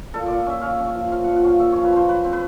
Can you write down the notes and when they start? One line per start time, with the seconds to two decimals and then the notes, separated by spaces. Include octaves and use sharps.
0.14 A#2 A4
0.26 A#2 D5
0.47 C#4 E5
0.61 C#4 F5
0.72 E5
0.79 C#4
0.95 F3
1.12 F3 F5
1.24 A#2 F#5
1.36 F#5
1.44 C#4 F5
1.59 A#2 E5
1.72 F3 C#5
1.84 B4
1.93 F3 C5
2.08 F#3 B4
2.24 C4
2.33 B4